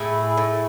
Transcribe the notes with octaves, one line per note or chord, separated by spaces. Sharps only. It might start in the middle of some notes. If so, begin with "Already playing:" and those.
Already playing: A2 E4 G#4
A2